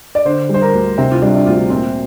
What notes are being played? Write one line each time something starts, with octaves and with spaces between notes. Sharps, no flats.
D5
D3 C5
G3 C5
A#4
D2
C3 C4
F4
G3 D4
D4
D2 F4
A#2 C4